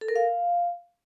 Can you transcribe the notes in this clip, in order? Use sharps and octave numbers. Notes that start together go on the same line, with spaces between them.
A4
A#4
F5